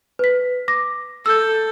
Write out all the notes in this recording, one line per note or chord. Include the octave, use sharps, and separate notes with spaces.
B4 B6
D6 A#6
A4 E6 G6